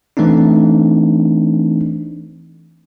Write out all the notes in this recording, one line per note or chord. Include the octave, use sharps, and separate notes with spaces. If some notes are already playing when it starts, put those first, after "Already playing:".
E3 A3 C4 D4 D#4